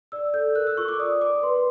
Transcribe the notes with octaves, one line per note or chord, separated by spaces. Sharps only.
D5 E6
A4 G6
A#4 F#6
E6
F4 C#6
D6
D5 D#6
A#4 D6
B4 C6